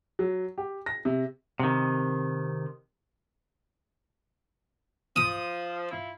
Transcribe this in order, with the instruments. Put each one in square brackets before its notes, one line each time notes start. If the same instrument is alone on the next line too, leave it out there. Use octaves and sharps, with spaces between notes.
[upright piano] F#3
G4
A#6
C3
[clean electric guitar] C3 D#3
[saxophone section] F3 [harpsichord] D#6
[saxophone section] E4 F4